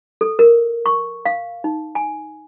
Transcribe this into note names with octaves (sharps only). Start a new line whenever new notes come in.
A4
A#4
C#6
F5
D#4
G#5